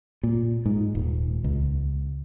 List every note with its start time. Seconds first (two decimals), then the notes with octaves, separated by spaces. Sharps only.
0.23 A#2
0.66 G#2
0.95 D#1
1.44 C#2